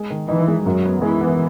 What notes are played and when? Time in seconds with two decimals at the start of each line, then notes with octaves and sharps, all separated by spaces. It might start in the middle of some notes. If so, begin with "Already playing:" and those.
Already playing: G#3
0.10 D#3
0.28 E3 D#4
0.48 G#3
0.65 F#2 F#3
0.84 B3
1.02 E3 G#3
1.20 B3